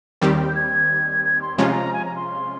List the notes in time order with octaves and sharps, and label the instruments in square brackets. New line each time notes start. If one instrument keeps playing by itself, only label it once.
[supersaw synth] D#2 D#3 G3 C4 G4
[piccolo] G6
G#6
G#6
C6
[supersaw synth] C3 F3 G#3 C#4 F4 [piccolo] A#5
[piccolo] G#5
A#5
C6